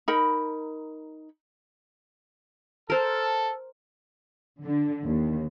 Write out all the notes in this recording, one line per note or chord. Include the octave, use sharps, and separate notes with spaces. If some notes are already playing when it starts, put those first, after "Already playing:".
D#4 A#4 B5
A4 A#4 C5
D3
D#2